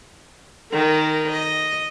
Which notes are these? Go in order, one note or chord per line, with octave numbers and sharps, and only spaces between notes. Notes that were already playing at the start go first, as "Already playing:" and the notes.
D#3 A#4
D#5